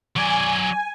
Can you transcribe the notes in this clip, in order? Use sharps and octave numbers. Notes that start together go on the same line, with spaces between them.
F#3 D5 G#5